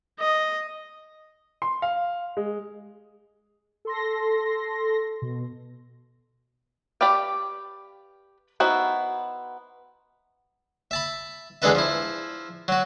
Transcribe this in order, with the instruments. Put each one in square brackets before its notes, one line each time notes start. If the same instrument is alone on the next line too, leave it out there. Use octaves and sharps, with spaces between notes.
[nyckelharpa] D#5
[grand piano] C6
F5
G#3
[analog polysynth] A4 C6 A#6
B2
[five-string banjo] G4 B4 D5 F5 G5
B3 D#4 E4 F#4 C5
[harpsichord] E5 A5 B5
E2 G#3 D4 A4 B4 E5
F3 E4
F#3 F#4